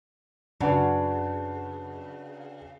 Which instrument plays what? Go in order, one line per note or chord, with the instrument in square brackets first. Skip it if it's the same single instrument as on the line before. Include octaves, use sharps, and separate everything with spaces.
[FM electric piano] F#2 [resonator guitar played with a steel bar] C#3 [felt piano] D4 F#4 [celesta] B4 F#5 A5